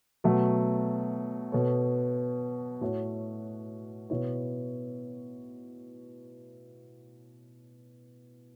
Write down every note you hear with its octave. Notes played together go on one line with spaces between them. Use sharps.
B2 F#3 A3
B2 B3 A4 C#5
A2 A3 F#4 C#5
B2 B3 E4 C#5